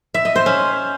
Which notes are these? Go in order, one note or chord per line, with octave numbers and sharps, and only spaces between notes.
E5
D#5
C5
C#4